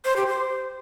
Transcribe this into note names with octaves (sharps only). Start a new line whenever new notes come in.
C5
G4
C5